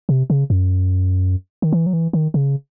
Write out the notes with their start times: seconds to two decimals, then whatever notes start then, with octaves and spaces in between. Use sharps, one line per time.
0.09 C3
0.30 C#3
0.50 F#2
1.62 D#3
1.73 E3
1.86 F#3
1.93 E3
2.13 D#3
2.34 C#3